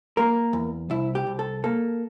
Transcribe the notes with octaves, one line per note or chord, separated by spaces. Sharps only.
A#3 A#4
E2
C2 E4
G4
C2
A4
A#3 A4